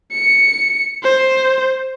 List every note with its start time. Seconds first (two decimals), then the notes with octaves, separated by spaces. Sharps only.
0.12 C#7
1.03 C5